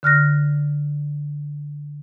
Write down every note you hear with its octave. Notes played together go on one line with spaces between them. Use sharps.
D3 F6 F#6 A#6